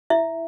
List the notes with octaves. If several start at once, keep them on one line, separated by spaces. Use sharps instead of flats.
E4 E5